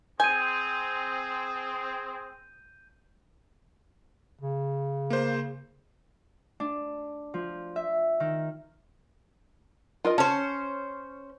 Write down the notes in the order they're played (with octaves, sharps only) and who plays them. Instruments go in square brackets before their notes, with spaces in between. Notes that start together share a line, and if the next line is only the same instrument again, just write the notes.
[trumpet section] C4 G#4 [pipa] G#5 [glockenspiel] G6 D#7
[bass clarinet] C#3
[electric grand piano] A#3 C5
[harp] D4
F3
E5
D#3
[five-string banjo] F4 A#4 D#5
[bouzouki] C#4 C5 [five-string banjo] A5